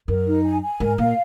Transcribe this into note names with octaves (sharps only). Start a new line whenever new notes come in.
F#2 A#4
D#4
G#5
G#5
G#2 A#4
A#2 F5